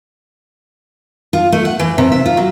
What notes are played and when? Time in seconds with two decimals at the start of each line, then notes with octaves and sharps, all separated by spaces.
1.33 F4
1.52 A3
1.65 F#5
1.79 E3
1.98 C3
2.12 E5
2.26 F4
2.37 F#3